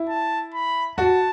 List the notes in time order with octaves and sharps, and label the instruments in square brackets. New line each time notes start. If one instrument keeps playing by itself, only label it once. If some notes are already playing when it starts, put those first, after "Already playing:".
Already playing: [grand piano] E4
[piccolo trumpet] A5
B5
[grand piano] F#4 [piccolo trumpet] A5